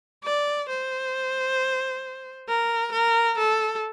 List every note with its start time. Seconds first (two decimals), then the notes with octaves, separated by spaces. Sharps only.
0.24 D5
0.69 C5
2.48 A#4
2.93 A#4
3.38 A4